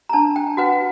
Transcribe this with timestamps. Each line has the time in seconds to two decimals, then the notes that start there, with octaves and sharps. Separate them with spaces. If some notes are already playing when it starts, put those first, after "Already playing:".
0.09 A#5
0.13 D4 A5
0.36 G5
0.57 F#4 B4 F#5